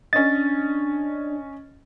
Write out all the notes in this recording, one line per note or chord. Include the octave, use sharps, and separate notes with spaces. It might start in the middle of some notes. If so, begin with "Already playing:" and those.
C#4 D4 D#5 A6